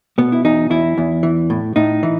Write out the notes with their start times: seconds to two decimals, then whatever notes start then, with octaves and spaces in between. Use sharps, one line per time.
0.18 B2 B3
0.32 E4
0.45 E2 D#4
0.70 E2 E4
0.98 E2
1.23 E3
1.50 A2
1.76 A2 D#4
2.03 E3